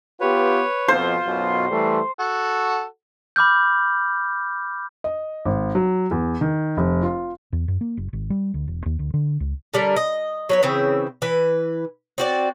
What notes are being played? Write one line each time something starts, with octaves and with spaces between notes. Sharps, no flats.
B3 F4 G4 B4 C#5
F2 B2 F4 C5
B1 F#2 B2
E3 G3 A3
F#4 A4 F#5
B5 D6 F6 G6
D#5
G#1
F#3
E2
D#3
F1
F4
E2
F#2
A#3
F#1
G#1
G3
D2
E1
D#2
D2
D3
C#2
D3 G3 A#4
D#5
F#3 B3 C#5
C#3 E3 C4 E5
E3 B4
C4 F#4 D5